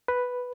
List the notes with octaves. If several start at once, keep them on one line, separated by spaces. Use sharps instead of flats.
B4